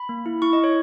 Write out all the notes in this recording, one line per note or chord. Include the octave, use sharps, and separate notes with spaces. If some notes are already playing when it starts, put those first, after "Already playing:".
Already playing: B5
A#3
E4
E4 C#6
D#5
E4
C#5